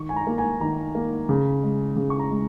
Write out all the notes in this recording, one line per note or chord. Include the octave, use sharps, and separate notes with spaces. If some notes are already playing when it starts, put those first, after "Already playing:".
Already playing: D#3 C#6
G#5
A#5
A#3
G#5
D#3 A#5
A#3
C#3
G#3
C#3
C#6
A#5
G#3